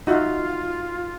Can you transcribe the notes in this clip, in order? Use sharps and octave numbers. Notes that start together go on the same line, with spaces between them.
D#4 F4 F#4 E5